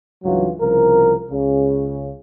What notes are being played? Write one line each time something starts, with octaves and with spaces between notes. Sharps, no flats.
C#2 G2 E3 F#3 F4
C2 C#3 F3 A#4
C#2 C#3